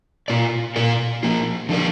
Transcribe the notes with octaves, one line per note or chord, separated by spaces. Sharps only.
A#2 A#3 F4 D5
A#2 A#3 F4 A#4 D5
F3 A#3 F4
D3 F3 D4 A#4 D5